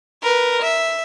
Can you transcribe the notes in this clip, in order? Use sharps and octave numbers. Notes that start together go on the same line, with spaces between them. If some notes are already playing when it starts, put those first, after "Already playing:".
A#4 B4
E5